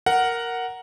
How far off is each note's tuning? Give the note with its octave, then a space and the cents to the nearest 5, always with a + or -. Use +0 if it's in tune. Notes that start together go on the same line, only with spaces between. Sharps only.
A#4 +0 F#5 +0